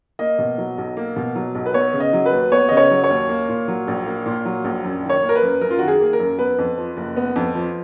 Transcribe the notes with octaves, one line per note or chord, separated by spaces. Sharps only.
A#3 D#5
B2
F#3
B1
A#3
B2
F#3
B1
B4
B3 C#5
C#3
D#5
F#3
B4
D#2
B3 C#5
C#3 D#5
C#5
F#3
C#5
D#2
A#3
A#2
F#3
A#1
A#3
A#2
F#3
A#1
F#2
D#3
C#5
A#3
A#4
B4
F#2
F#2 A#4
F4
D#3 F#4
G#4
A#3
A#4
F#2
B3 B4
F2
F3
F#1
B3
F2
F3